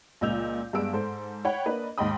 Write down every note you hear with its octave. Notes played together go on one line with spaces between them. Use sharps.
C#2 A#2 D#5 E6 G6 F7
G2 G#3 B3 E6 D7
G#2 A4 C5
C#5 F#5 G5 B5
A#3 D4 B4 D#5
D#2 G#2 D#5 G5 B5 D#6